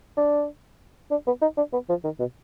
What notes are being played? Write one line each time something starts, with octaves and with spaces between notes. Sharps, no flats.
D4
D4
B3
D#4
D4
B3
F3
D#3
B2